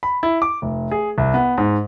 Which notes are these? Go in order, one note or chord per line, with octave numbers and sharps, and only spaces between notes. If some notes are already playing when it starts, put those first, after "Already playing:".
B5
E4
D6
F1
G#4
C2
B3
G#2